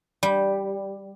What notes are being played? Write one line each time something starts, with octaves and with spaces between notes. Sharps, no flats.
G3